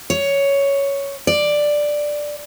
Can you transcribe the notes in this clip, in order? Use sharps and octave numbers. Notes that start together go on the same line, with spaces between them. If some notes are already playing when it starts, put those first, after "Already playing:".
C#5
D5